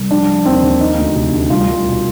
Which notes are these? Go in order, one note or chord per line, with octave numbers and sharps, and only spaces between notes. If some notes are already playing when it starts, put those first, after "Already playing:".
Already playing: C2
F3 D4
F3
D#2 C4
D#2
D#3 D#4
D2
C3
D2
C2 F4
C2
B2